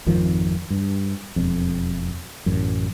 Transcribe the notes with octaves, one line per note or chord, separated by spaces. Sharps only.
G#1 F2 D#3 F3
G2
E1 F2
A1 F#2